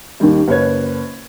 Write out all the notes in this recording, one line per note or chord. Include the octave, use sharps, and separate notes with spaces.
D#2 D#3 G3 D#4
F#1 B4 C#5 G#6